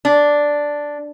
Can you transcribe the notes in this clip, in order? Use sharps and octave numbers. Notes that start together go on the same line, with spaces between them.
D4